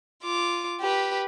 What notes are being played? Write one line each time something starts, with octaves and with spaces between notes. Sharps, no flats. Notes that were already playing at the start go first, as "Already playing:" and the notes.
F4 D6
G4 B4